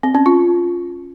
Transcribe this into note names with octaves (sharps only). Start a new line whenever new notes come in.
C4
C#4
F4